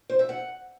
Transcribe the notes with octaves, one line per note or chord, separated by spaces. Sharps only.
C5
E5
F#5